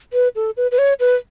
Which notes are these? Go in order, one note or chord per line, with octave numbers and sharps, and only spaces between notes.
B4
A4
B4
B4
C#5
B4